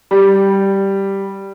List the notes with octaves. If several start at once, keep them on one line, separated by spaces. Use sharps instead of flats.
G3